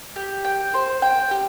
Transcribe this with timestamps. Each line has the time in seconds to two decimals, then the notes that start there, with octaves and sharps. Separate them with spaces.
0.16 G4
0.45 G5
0.74 C5
1.02 G5
1.31 G4